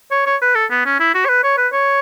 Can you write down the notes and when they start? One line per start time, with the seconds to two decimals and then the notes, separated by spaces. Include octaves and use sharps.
0.11 C#5
0.26 C#5
0.42 B4
0.55 A4
0.70 B3
0.86 C#4
1.00 E4
1.15 F#4
1.25 C#5
1.29 B4
1.44 C#5
1.58 B4
1.73 C#5